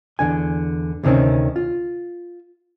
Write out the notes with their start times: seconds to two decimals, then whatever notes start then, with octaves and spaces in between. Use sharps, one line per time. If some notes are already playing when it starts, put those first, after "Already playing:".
0.19 E2 G#2 D3 G#5
1.03 D2 C3 D#3 C4 C#4
1.56 F4